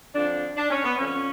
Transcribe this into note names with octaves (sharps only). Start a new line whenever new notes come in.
F2 D3 F3 D4
D4
C#4
B3
F2 D3 F3 C#4